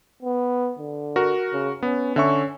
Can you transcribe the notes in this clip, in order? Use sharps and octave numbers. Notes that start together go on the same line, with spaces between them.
B3
D3
F#4 A#4
C#3
B3 C#4
D3 C#4 E5 C#6